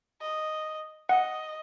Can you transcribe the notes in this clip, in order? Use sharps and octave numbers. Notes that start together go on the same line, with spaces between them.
D#5
D#5 F#5